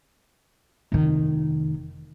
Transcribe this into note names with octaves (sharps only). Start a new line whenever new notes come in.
F1 D#3